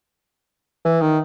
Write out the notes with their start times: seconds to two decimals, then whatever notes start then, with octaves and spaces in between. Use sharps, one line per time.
0.85 E3
1.02 D#3